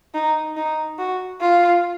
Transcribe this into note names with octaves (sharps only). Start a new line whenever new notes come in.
D#4
D#4
F#4
F4